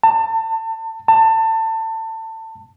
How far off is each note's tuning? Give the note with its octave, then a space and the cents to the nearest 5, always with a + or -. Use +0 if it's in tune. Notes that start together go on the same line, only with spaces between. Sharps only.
A5 +30
A5 +25